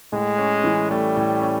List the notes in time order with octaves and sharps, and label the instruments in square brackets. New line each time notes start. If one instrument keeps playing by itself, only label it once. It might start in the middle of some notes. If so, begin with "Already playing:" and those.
[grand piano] A2 [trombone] G#3
[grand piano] C#4
E3
[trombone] G3 [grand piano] A3
[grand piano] A2
C#4